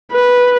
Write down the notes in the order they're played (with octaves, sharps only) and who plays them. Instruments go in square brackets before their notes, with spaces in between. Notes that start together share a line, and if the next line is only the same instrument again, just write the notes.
[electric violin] B4